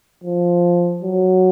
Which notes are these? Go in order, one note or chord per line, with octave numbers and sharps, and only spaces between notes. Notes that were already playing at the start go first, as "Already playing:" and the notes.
F3
F#3